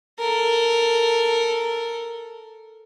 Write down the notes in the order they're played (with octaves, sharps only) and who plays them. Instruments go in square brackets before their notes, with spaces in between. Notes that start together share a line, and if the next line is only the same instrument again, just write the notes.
[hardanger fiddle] A4 A#4